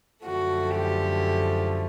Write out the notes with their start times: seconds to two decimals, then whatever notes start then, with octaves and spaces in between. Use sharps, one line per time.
0.25 F#2 D3 F3 A3 F#4
0.75 G4